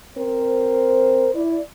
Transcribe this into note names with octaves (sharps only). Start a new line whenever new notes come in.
C4 A#4 C5
E4 D5